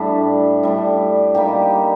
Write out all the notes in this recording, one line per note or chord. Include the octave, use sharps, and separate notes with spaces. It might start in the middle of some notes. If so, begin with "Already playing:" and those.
Already playing: A2 G3 A3 D4
A2 G3 D4
G3 A#3 D#4 G4